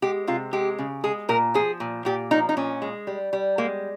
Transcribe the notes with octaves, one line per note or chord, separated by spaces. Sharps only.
G#3 G4
C3 F4
G#3 G4
C#3
G#3 G#4
A#2 A#4
F3 G#4
A#2
A#2 G4
F3 D#4
D#4
A#2 C#4
G#3
G3
G3
G#3 A#3